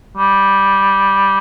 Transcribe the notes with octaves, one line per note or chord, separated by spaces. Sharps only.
G3